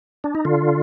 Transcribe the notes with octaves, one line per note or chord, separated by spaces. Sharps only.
D4
D#4
D3 F4